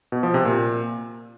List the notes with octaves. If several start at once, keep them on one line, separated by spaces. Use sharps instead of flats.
B2
F3
C3
A#2